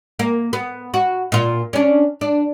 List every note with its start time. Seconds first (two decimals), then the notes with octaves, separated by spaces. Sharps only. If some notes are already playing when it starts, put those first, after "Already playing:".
0.19 A#3
0.53 B3
0.94 F#4
1.32 A#2 F4
1.73 C#4 D4
2.21 D4